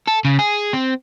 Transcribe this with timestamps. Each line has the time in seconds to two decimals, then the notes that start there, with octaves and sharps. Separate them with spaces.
0.07 A4
0.25 C#3
0.39 G#4
0.73 C4